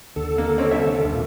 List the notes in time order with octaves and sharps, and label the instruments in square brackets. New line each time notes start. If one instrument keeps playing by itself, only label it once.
[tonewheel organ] D#2 D3 A4
[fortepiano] A#3
C4 C#4
C2 E5
[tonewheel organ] A#2 A#3